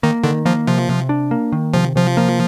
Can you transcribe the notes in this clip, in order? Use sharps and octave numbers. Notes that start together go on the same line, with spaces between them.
D#3 A#3
D3 D#3
F3 A#3
C3 F3
C3
D4
A#3
D#3
C3 F3
C3 F3
A#3